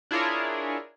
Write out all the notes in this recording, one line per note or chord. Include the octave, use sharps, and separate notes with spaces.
D4 E4 F4 G#4 A#4 C#5